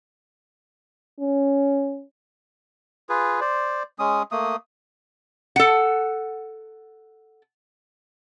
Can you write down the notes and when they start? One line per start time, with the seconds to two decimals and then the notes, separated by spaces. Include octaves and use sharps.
1.19 C#4
3.09 F4 G#4 B4
3.41 C5 D5
3.99 G#3 C#4 D#6
4.32 A3 A#3 D#6
5.56 A4 F#5